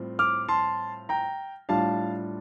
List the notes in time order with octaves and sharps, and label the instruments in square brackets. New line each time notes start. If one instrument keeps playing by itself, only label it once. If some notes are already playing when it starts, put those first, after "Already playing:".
Already playing: [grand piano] A2 G3 C4 F4
D6 F6
A5 C6
G5 A#5
A2 G3 D4 F4 F5 A5